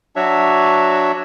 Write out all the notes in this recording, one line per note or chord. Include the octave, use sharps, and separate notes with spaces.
F#3 D4 F#4 C#5 E5